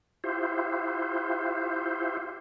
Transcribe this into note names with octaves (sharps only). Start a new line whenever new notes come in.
E4 F4 G4 C5